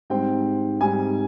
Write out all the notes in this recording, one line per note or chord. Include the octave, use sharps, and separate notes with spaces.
G#2 G3 C4 G5
G#2 G3 C4 G#5